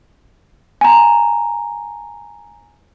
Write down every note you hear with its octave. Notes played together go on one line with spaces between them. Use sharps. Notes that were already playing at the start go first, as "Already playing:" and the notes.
G#5 A#5